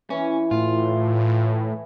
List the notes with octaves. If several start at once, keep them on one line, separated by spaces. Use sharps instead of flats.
E3 C#4
A2 F4